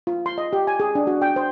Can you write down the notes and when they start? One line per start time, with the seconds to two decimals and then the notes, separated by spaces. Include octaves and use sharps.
0.07 F4
0.26 C6
0.38 D#5
0.53 G4
0.67 G#5
0.80 G#4
0.95 D4
1.07 F#4
1.22 G5
1.36 C5